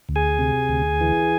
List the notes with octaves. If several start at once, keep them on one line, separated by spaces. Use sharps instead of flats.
D2
G#4 G#5
C3
D2
E3